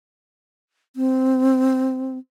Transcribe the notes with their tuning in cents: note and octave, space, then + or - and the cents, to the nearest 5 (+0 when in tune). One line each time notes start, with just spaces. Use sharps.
C4 -5